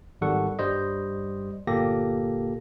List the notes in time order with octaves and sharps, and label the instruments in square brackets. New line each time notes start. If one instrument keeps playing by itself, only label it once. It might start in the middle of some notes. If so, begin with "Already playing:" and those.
[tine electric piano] G#1 D#3 G3 A4 F#5 C#6
G2 G3 C5 D#5
G1 A#2 A#3 G4 A4 A#6